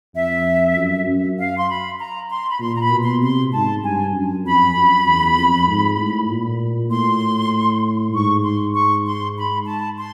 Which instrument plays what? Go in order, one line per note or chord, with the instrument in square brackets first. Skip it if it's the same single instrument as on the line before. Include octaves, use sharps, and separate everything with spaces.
[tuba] F2 [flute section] E5
[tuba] F#2
F#2
[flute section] F5
C6
B5
A#5
C6
B5
[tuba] A#2 [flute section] C6
[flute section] A#5
B5
[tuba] B2
[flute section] C6
[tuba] C3 [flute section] C6
[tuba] G#2 [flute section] A5
[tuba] G2 [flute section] G#5
[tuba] F#2
[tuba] F2 [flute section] B5
[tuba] F#2
E2
F2
G#2
A2
A#2
[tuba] A2 [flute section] C6
[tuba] G#2 [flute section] C#6
[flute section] C6
C#6
C6
B5
A5
C6